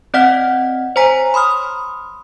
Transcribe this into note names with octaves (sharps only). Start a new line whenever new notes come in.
C4 D5 D#5 F#5 F6 B6
C5 C#5 G#5 A#5 B6
B5 C6 D#6 F6